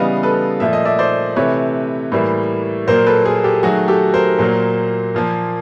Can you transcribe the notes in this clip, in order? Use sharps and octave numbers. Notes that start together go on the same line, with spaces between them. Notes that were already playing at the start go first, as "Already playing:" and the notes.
Already playing: C#3 E3 G3 B3 D#5 F5
A4 B4
A#2 F3 A3 E5
D#5
D5 E5
C5 D5
C3 E3 A3 B4 C#5
A2 E3 G3 A#3
A#2 F#3 A#3 A#4 C5
A4 B4
G#4 A#4
G4 A4
D#3 F#3 A3 F#4 G#4
G4 A4
A#4 C5
A#2 F#3 A#3
A#2 F3 A#3